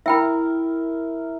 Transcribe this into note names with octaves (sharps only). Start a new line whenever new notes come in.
E4 A#4 E5 G5 B5